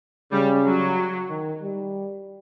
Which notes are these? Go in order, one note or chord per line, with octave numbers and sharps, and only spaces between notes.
C#3 G3
F#3
D#3
G3